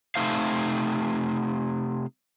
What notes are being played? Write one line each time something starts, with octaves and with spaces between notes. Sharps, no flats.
C3 A3 D#4 C5 F5